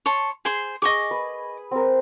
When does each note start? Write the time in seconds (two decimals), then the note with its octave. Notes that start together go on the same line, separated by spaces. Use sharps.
0.06 C#5 A5 C6
0.45 G#4 C5 C6
0.82 G#4 D#5 G#5 C#6 D6
1.11 B4
1.71 C4 A#4